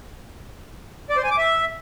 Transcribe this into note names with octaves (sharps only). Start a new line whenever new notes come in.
D5
C5
G#5
D6
E5